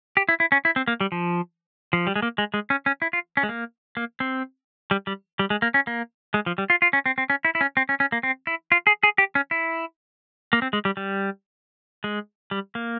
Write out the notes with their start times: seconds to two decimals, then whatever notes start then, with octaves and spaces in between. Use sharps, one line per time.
0.17 G4
0.29 E4
0.40 E4
0.52 C#4
0.65 E4
0.76 C4
0.88 A#3
1.01 G3
1.12 F3
1.93 F3
2.07 G3
2.16 G#3
2.22 A#3
2.38 G#3
2.54 G#3
2.70 C#4
2.86 C#4
3.02 E4
3.13 F4
3.37 C#4
3.43 G#3
3.49 A#3
3.97 A#3
4.20 C4
4.91 G3
5.07 G3
5.39 G3
5.50 G#3
5.62 A#3
5.74 C#4
5.87 A#3
6.34 G#3
6.46 F3
6.58 G3
6.70 F4
6.82 F4
6.93 C#4
7.06 C4
7.18 C4
7.30 C#4
7.45 E4
7.55 E4
7.61 C#4
7.77 C4
7.89 C#4
8.00 C#4
8.12 A#3
8.23 C4
8.47 E4
8.72 F4
8.87 G#4
9.03 G#4
9.18 G4
9.35 C#4
9.51 E4
10.53 A#3
10.62 C4
10.73 G#3
10.85 G3
10.97 G3
12.04 G#3
12.51 G3
12.75 A#3